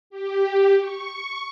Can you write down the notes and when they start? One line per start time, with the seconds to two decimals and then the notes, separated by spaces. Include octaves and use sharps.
0.10 G4
0.78 C#6